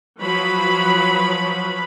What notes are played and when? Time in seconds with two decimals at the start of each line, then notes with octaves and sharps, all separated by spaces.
0.21 F3 F#3 B4 B5